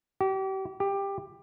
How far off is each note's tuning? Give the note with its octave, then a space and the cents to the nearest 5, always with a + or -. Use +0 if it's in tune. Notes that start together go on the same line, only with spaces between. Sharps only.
G4 -35
G4 +15